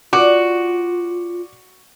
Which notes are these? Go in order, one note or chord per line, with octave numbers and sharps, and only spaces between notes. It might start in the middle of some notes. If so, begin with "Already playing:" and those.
F4 F#4 D5 D6